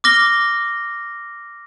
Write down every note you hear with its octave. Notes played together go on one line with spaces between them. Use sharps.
D6 F6 A#6 G7